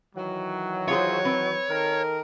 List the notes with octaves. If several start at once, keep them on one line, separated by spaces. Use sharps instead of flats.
D#3 E3 F#3
F4 G#4 C5 C#5
C4 B4
D#3 A4 A#4